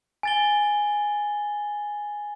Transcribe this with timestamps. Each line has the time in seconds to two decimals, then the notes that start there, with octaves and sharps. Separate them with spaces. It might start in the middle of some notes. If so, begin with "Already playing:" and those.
0.23 G#5 A6 G7